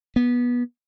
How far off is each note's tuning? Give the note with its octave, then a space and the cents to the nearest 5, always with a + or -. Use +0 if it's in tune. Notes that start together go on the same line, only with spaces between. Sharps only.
B3 -20